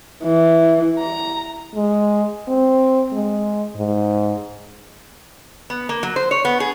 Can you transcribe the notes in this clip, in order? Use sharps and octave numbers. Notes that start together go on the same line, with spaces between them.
E3
A#5
G#3
C4
G#3
G#2
B3
A#3
F#3
C5
C#5
B3
G#4